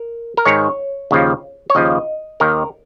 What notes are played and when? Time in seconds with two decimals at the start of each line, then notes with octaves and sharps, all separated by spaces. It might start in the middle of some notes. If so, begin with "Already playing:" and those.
Already playing: A#4
0.37 A#4
0.45 G#2 D#3 C#5
1.11 D#2 C#3 F3
1.70 C#5
1.75 D#2 C#3 F3 D#5
2.40 D#2 D#3 A#4